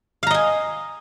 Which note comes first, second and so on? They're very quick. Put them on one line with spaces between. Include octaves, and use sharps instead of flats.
F5 A#5 D#5 G#5